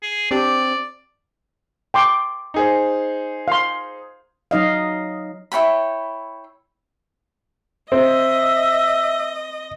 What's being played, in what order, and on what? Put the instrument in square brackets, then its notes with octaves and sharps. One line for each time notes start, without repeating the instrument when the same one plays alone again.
[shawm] G#4
[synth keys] C4 D4 G4 [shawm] D5
[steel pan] G5 C6 D6
[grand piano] D#4 G#4 C5
[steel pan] F5 C6
[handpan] F#3 D#4 D#5 F5
[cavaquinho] E4 C#5 G5 B5
[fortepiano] C4 [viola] D#5 [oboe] E5